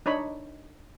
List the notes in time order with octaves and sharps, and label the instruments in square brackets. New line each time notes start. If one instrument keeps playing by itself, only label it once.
[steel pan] D4 D#4 C#5 B5